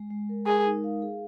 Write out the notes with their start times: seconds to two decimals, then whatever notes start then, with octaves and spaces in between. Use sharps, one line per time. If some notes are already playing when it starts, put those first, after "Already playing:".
Already playing: G#3
0.10 G#3
0.29 A#4
0.47 G#4 A#4
0.66 D#4
0.84 F5
1.02 G#4